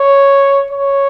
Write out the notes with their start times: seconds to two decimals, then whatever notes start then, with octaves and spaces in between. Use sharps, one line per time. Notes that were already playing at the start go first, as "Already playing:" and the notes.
Already playing: C#5
0.71 C#5